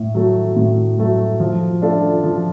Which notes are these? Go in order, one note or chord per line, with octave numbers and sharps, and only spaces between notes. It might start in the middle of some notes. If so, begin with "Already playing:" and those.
Already playing: A2
F#3 A3
A2
F#3 A3
F3
A3 D4 F4 A4
F3